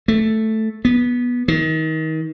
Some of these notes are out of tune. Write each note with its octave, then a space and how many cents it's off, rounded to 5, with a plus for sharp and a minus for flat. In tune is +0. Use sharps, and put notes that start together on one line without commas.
A3 +0
B3 -15
D#3 +30